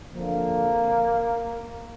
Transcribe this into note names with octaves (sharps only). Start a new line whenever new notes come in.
F2 D3 F3 A#3